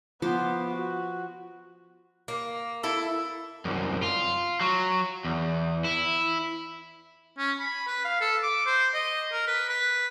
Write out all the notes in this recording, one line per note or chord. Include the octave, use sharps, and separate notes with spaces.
F3 B3 C5 D6
F#4
A#3
E4 A4
C2 F#2
F4
F#3
E2
E4
C#4
B5
B4
F5
A4
D6
C5
D#5
A#4
B4
B4